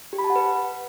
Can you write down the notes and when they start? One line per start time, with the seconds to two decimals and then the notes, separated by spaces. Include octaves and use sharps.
0.13 G4
0.18 B5
0.24 A5
0.30 F#5
0.36 B4